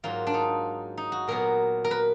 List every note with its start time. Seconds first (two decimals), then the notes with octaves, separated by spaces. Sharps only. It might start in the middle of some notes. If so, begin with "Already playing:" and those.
0.03 G#2 F#3 A#3 F4
0.27 D4
0.34 D#4
0.97 D#4
1.12 F#4
1.28 A#2 F#3 B3 A#4
1.84 A#4
1.91 B4